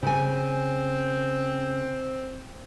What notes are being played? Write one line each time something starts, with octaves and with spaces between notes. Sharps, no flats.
C#3 C4 G#5